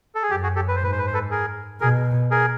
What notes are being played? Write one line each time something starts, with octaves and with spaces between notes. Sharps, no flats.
A4
G#4
F#2 G4
F#4 G#4
G4 A4
B4
C5
G#2 B4
C5
B4
C5
A4 B4
G#4 A#4
B2 G#4 A#4
G#4 A#4